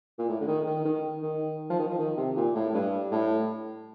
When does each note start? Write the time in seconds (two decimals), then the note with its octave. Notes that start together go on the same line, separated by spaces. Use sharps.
0.18 A#2
0.29 A2
0.40 D3
0.47 D#3
0.66 D#3
0.85 D#3
1.22 D#3
1.70 F3
1.79 D#3
1.88 F3
1.99 D#3
2.17 C3
2.36 A#2
2.55 A2
2.74 G2
3.11 A2